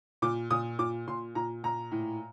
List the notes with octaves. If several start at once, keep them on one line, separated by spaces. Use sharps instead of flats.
A#2 D6
A#2 D#6
A#2 D6
A#2 C6
A#2 A#5
A#2 A#5
A2